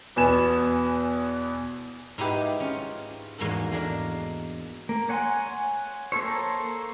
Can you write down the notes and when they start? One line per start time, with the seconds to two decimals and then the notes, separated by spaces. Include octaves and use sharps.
0.16 E2 B2 B3 G#5 E7
2.18 G#2 D#4 E4 G4 B4
2.60 C#4 F4
3.38 E2 G#2 A#3 F#4 A4
3.72 G#3 A#3 D4 A#4
4.89 A#3
5.09 C#5 F#5 G#5 C6
6.12 A#3 A4 C5 C#5